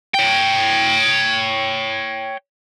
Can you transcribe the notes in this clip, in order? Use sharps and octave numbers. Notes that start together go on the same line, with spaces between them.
C#5 G5